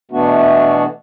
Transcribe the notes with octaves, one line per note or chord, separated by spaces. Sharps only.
B2 E3 A3 B3 D4 F#4